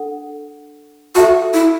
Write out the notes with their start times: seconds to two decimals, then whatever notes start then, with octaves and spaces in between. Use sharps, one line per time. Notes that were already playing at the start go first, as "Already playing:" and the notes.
Already playing: D4 A4 F#5
1.15 F#4 A4 E5 A5 C#6
1.53 E4